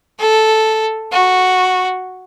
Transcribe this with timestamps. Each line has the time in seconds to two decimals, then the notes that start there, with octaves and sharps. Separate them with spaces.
0.19 A4
1.12 F#4